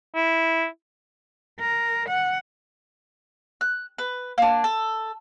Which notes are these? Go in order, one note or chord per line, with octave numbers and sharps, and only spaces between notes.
E4
A#4
F#5
F#6
B4
A#3 D4
A4